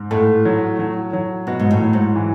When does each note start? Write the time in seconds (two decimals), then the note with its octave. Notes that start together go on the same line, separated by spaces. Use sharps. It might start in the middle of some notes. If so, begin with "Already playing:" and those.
Already playing: G#2
0.11 A2 A3
0.45 F#3
0.79 F#3
1.13 F#3
1.47 B2 F#4
1.59 G#2
1.71 A2
1.81 F#3
1.93 G#2
2.16 E3